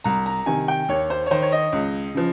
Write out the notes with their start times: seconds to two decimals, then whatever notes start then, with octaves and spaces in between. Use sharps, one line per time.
0.04 C2 A#5
0.26 A#5
0.46 C3 D#3 G#5
0.68 G5
0.89 D#2 C#5
1.10 C5
1.26 C#5
1.31 D#3 C5
1.42 C#5
1.52 D#5
1.72 C#2
2.14 C#3 F3